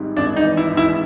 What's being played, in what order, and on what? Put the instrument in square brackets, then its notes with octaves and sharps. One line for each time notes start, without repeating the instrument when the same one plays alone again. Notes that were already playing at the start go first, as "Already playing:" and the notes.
Already playing: [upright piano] G#1 G#2 G3
[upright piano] G#1 [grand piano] D4
[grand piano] D#4
[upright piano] E3
[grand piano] E4
[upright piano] G#2
[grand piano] E4